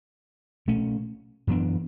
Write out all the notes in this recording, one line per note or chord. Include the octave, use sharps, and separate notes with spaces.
B2 A3 C#4
F#2 E3 B3 D4